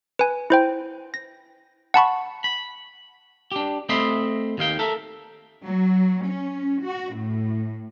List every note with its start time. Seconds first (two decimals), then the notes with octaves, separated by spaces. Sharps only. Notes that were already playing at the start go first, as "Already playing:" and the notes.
0.19 B4 G#5
0.50 E4 C5 G5
1.14 A#6
1.94 F#5 A5 B5 C#6
2.44 B5
3.52 D4 G4
3.89 A3 C4 D#5 E5 B5 C6
4.58 D#2 D#3 F5 G5
4.79 A4 A#4 E5
5.64 F#3
6.25 C#4
6.82 F#4
7.15 A2